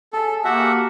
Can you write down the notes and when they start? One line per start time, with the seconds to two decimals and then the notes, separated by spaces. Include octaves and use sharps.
0.13 G#4 A4 E5
0.44 A#3 F#4 G4 E5 F#5 G5 A5